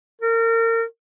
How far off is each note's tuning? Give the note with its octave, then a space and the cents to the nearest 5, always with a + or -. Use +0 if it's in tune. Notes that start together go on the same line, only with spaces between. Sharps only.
A#4 -30